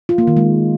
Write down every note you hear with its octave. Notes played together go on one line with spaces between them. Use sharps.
F4
A#3
D#3
G#3